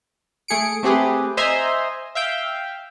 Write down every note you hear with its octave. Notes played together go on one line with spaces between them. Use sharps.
A3 G#4 C#7 D7
A3 C4 G4 G#4 B4
C5 D#5 E5 G#5 A#5 C6
E5 F5 G5